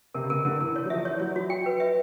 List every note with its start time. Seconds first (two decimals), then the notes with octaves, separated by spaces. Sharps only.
0.14 C3 A#4
0.23 C#3
0.30 C3 A#4
0.45 D3 A#4
0.60 E3 A#4
0.76 C#5
0.85 F#3
0.90 F3 E5
1.05 E3 C#5
1.20 F#3 C#5
1.36 F#4
1.50 G5
1.66 B4
1.80 E5